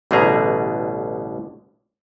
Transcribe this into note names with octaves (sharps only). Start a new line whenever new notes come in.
A1 B2 D3 G3 G#4 A#5